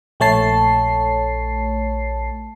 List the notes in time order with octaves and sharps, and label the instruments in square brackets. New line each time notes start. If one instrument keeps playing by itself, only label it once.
[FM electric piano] A#1 A3 C#5 A5 C7